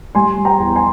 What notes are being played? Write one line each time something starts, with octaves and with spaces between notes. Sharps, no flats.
G3 G#5 C6
G3
G5 A#5
E2
G#5 C6